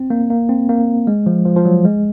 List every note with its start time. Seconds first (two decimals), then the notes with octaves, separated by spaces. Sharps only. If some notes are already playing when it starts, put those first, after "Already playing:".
Already playing: C4
0.10 A#3
0.30 A#3
0.49 C4
0.69 A#3
1.07 G#3
1.26 F3
1.45 F3
1.56 F3
1.65 F#3
1.85 G#3